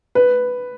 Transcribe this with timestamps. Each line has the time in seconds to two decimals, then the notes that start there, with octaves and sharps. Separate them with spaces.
0.15 B4